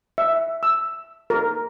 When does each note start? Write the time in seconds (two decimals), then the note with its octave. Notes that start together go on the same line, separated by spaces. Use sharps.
0.18 E5
0.63 E6
1.30 A#4